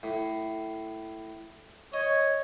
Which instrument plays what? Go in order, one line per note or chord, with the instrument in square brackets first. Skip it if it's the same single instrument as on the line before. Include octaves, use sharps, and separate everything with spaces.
[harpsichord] A2
[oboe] C#5 [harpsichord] D#5